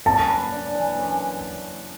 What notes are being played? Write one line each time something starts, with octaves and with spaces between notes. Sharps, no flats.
F#2 A5
B4
D4
E3
F#2